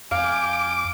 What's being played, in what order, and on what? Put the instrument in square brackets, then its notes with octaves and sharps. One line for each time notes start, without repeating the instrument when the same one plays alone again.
[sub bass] F2 [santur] F5 [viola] G5 G#5 [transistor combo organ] D6